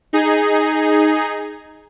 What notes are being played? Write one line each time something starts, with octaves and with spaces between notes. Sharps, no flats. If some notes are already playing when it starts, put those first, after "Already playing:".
D#4 G#4